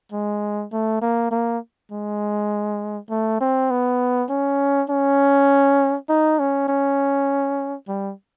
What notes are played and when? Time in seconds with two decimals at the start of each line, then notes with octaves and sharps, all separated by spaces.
0.12 G#3
0.72 A3
1.02 A#3
1.31 A#3
1.92 G#3
3.10 A3
3.40 C4
3.70 B3
4.30 C#4
4.89 C#4
6.09 D#4
6.39 C#4
6.68 C#4
7.88 G3